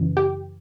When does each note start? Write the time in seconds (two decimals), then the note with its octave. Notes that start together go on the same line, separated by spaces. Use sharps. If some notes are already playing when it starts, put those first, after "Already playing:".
Already playing: F#2 C#3 E3
0.17 G4